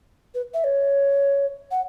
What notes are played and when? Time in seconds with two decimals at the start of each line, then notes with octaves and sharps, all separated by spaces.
0.35 B4
0.54 E5
0.64 C#5
1.71 F#5